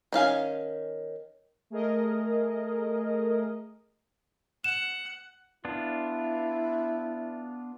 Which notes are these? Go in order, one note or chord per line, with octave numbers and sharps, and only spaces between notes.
D#3 C#4 F5 G#5
A3 G#4 A#4 D#5
F#5 E7
B3 D4 E4 F4